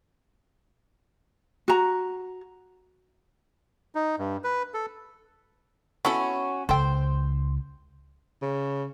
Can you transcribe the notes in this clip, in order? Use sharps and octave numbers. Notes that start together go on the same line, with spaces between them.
F#4 A#5
D#4
G2
B4
A4
B3 C#4 E4 F#4 A4
C#2 A4 C5 G5
C#3